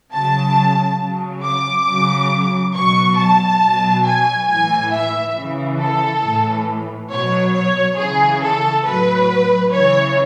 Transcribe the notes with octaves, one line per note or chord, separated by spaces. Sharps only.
C#3 F#3 A5
C#3 F#3
D6
C#3 F#3
B2 F#3 C#6
A5
B2 F#3
G#5
A2 E3 G#5
E5
C#3 E3
A4
A2 E3
B2 F#3 C#5
C#5
C#3 E3 G#4
A4
A2 F#3 B4
C#3 E3 C#5